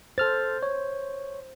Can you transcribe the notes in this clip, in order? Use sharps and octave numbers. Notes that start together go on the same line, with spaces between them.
A4 C5 F6 A6
C#5